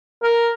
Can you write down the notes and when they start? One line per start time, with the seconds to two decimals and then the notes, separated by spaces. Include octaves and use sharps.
0.23 A#4